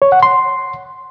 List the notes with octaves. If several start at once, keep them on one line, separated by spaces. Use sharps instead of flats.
C#5
F#5
C6